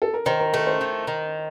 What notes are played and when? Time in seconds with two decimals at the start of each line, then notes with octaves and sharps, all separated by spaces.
0.02 A4
0.14 A#4
0.26 D#3 C5
0.40 A#4
0.53 A3 A#4
0.67 C5
0.81 D#3
1.07 D#3